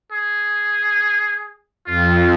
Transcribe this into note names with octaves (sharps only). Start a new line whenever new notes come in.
G#4
F2 F4